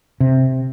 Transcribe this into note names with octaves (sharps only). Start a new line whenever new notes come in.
C3